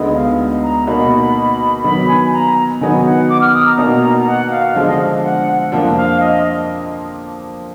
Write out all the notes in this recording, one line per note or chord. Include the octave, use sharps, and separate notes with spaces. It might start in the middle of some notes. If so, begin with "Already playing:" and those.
Already playing: D2 D3 G#3 B3 D#4
F5
A#5
B2 A#3 D#4 F#4 B5
D#3 F#3 B3 B5
G#5
A#5
D#3 F#3 B3 D#4 F#4 G#5
F#5
D6
F6
D#6
A#5
B2 A#3 D#4 F#4
F#5
F5
D3 F3 G#3 D4 F5
D#5
F5
F#5
F#5
F2 F3 A#3 D4 F4
F5
D#5